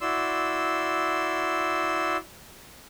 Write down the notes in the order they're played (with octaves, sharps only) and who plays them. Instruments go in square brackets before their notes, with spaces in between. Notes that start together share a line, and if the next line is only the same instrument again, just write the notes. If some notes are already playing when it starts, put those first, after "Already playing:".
[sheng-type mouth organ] E4 F#4 D5 C6 E6